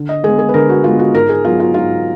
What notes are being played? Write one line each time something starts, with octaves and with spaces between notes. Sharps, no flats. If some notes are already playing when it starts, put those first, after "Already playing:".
Already playing: D3
D#5
G#3 B3 G#4
G#4
B4
D3 A#4
F#4
G#3 B3 F4
F#4
G#2 A#4
G#4
F#3 B3 F4
F4
G#2 F4